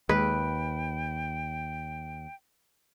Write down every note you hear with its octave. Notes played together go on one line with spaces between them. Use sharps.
D#2 G#3 B4 G5